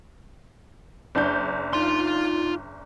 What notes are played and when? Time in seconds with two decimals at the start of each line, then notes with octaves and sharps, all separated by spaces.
1.15 F#1 D4 G6
1.73 D#4 F4 C6